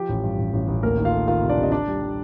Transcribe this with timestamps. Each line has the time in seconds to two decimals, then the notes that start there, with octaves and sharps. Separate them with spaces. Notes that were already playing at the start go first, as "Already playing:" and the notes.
Already playing: F3 G4
0.09 A1
0.24 G2
0.39 A1
0.53 A1
0.68 A1
0.83 D2 A#3 A#4
0.98 D#3
1.05 F4 F5
1.12 A3
1.28 D#3 F4 F5
1.42 C3
1.49 D4 D5
1.58 C3
1.63 D#5
1.72 D4 D5
1.88 G3
2.02 G3